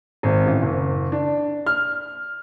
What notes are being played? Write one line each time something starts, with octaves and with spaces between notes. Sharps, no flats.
G#1
A1
F#1
D4
F6